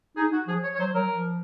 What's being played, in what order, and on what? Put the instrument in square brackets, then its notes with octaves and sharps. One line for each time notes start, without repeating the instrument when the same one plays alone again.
[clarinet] D#4 [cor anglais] G#4
[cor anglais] F#4
[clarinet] F3 [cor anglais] G#4
[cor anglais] C#5
C#5
[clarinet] F#3 [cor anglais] C5
[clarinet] F#3 [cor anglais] A#4
[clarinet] F3